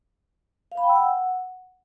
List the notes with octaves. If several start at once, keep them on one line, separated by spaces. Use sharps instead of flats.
F5
B5
G5
E6
F#5